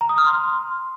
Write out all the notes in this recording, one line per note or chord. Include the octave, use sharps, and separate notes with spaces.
A#5
D#6
F6
C6